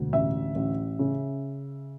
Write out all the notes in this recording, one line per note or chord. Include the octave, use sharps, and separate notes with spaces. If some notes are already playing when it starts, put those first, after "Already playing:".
Already playing: E1 D2
A1 E5
A1
C#3